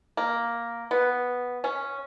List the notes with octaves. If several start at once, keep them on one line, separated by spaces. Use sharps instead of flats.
A#3
B3
C#4